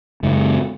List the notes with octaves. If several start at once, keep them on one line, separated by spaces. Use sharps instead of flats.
F#2 C#3 G#3